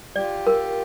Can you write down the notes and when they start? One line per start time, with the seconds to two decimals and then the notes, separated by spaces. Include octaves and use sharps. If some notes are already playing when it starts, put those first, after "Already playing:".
0.16 F4 G4 D5
0.47 A#4